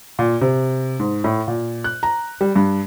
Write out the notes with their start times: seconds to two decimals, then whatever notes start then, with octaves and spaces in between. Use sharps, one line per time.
0.19 A#2
0.41 C3
1.00 G#2
1.24 A2
1.48 A#2
1.84 F#6
2.03 A#5
2.41 G3
2.56 G2